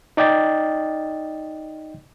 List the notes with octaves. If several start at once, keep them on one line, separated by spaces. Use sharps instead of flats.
D#4 D5 D#5 G5 A6